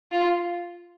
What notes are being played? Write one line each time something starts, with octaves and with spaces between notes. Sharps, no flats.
F4